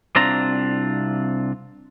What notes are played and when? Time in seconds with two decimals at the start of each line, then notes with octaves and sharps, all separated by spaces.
0.16 C2 C4 D4 F4 A#5